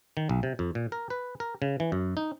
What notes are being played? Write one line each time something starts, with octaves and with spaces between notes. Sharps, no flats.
D#3
B1
C3
F2
A#2
A#4
B4
A#4
C#3
E3
F#2
D#4